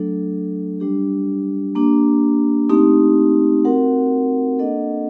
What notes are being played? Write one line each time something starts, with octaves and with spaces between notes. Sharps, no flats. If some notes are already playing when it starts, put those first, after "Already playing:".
Already playing: F#3 A3 D4 A4
G3 D4 G4
A#3 D4 G4
A3 C4 D#4 G4
C4 F#4 A#4 F#5
A#3 D4 A4 D#5 F#5